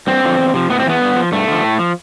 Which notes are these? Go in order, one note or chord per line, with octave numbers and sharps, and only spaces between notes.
G2 C4
D3 F3
E2
C3 F3
A2 B3
C4
E3 B3
G2
F3
G2 A3
D3 F3
A2
F3